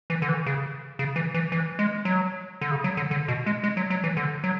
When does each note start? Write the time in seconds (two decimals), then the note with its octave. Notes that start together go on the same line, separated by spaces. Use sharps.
0.10 E3
0.22 D3
0.29 E3
0.46 C#3
0.99 C#3
1.16 E3
1.34 E3
1.52 E3
1.79 G#3
2.05 F#3
2.61 D3
2.71 C#3
2.84 F#3
2.97 D3
3.11 D3
3.28 B2
3.46 G#3
3.64 G#3
3.77 F#3
3.90 F#3
4.04 E3
4.17 D3
4.44 F#3